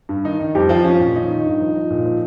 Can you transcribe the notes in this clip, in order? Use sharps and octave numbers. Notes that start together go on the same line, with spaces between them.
G2
D#3 D#4
D#3
F2 G3 G4
F3 F4
F3 C#4
A#2 C#4
D#3 D#4
D#3
G2
F3
F3
A#2
F3